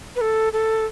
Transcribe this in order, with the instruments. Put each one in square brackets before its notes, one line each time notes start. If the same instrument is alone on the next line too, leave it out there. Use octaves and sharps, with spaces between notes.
[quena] B4
A4
A4